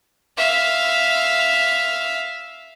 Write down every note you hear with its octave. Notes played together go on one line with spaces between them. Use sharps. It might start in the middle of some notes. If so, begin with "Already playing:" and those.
E5 F5